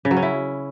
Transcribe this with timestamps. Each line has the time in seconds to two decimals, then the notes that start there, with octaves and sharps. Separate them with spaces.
0.05 C#3
0.11 F#3
0.17 C#4
0.22 E4